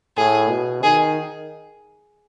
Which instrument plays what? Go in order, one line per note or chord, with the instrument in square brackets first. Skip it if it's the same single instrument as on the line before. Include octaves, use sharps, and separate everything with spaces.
[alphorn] A2 [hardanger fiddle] G#4
[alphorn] B2
[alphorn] D#3 [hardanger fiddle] G#4